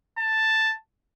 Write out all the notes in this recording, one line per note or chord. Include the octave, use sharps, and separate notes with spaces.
A5